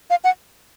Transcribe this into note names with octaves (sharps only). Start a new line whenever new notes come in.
F5
F#5